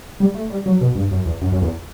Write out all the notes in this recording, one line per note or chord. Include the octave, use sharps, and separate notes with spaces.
G3
A3
G3
F#3
B2
G2
F#2
E2
F#2
F#2
E2